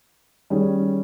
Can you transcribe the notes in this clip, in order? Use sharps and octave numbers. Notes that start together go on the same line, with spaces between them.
D#3 G3 C#4 G#4